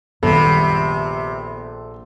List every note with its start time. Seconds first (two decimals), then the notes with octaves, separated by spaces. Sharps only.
0.23 A#1 F#2 C3 D#3 G3 B3 A4